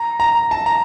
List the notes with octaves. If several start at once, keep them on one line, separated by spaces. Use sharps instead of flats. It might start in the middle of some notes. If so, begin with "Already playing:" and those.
Already playing: A#5
A#5
A5
A#5